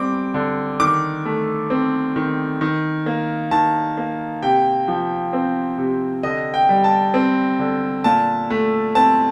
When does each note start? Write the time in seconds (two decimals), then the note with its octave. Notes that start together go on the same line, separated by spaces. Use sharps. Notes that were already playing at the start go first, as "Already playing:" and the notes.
Already playing: G3 C4 D6
0.34 D3
0.80 D#3 D6
1.25 A3
1.70 C4
2.16 D#3
2.61 D#3
3.06 A#3
3.51 D#3 A5
3.98 A#3
4.42 C3 G5
4.88 F3
5.33 C4
5.78 C3
6.23 D3 D#5
6.54 G5
6.69 G3
6.84 A5
7.14 C4
7.59 D3
8.04 A#2 A5
8.50 A3
8.95 C4 A5